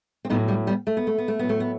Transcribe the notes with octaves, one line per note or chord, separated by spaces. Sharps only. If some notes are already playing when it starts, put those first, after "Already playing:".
C4
A2 F#3 B3 D#4
G3
G3 B3
A3
B3
A3
B3
A3
A2 F#3 B3
A3
B3